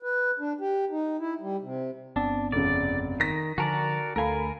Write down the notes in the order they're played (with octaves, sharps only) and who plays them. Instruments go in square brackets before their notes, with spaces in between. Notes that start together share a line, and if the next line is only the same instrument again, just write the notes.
[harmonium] B4
D4
G4
D#4
E4
G3
C3
[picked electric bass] G1 B3 C4 [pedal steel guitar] D4
[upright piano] F1 C#3 [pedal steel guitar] D5
[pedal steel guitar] D#3 [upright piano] A#6 B6
[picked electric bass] D3 F3 [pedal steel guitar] F#4 A#4 D5 [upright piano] G#5 A5
[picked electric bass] D2 A3 [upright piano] A4 F5 B5 [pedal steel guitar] A#4 G#5